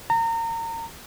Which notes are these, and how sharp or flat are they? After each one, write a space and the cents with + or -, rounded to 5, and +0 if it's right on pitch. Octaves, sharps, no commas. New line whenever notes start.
A#5 -30